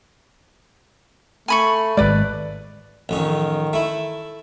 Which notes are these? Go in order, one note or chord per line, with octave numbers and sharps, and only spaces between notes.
A3 G#5 B5 C#6
G#1 G#3 B4 D5
A1 F2 D#3 C#4
A3 E4